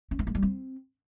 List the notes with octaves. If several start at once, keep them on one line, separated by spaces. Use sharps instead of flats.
C#4
A3
G#3
G3
C4